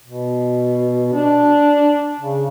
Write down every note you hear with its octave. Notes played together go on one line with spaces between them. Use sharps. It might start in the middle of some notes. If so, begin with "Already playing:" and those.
B2
D4
C#3